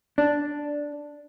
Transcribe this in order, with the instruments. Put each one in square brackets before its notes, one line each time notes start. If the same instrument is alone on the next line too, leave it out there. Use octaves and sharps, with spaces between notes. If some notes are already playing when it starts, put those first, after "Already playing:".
[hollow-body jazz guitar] D4